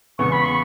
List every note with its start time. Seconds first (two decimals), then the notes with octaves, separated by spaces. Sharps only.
0.19 E2 C#3 E3 B3 C#6
0.32 B5
0.45 C#6